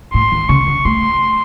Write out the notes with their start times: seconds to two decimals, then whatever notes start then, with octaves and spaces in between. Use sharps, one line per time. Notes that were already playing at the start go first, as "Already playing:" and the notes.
0.14 A2 C6
0.32 D#3
0.49 C#3 C#6
0.67 C#3
0.85 A3 C6